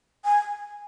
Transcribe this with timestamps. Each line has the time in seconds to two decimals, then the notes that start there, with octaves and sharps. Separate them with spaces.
0.25 G#5